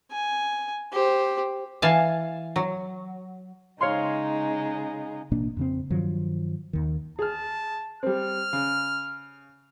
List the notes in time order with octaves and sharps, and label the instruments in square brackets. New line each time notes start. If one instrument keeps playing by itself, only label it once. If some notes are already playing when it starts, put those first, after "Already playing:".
[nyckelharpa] G#5
G4 C5
[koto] E3 F5 G#5 A5
F#3
[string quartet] C#3 G#3 D#4 [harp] C#5 F5 C6
[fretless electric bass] A1 B2 A#3 D4
F2 C#3 C4
G2 D#3 F3 F#3
D#2 D#3
[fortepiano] G#4 F6 [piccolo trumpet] A5
[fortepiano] G3 C4 [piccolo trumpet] F6
[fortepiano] C#3